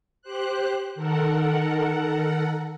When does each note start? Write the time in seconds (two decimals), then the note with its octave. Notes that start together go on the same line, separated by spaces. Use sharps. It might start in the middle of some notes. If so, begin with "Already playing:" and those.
0.22 G4 C5 F#6
0.95 D#3 A4 A#4 F#5